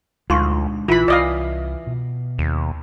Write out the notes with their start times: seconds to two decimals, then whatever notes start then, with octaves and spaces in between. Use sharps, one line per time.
0.30 D2 G#3 C4 D4 D#4 F4 C6 C#6
0.88 A#1 E3 E4 F4 B5
1.08 C2 D5 D#5 F5
1.87 B2
2.38 D#2